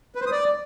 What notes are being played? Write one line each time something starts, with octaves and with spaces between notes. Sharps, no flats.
B4
C5
D#6
D5